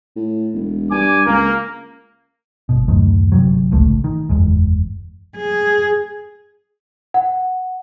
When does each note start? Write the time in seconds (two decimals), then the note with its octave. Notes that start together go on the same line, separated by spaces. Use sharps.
0.16 A2
0.54 E1
0.91 G2 G#5 D6
1.26 C#2 A#3
2.69 G1 B2
2.88 D1 F#2 D#3 A3
3.32 G1 C3 F#3
3.71 D1 G#1 C#2 A3
4.04 D#3
4.29 F#1 E2 G#2
5.36 G#4
7.14 F#5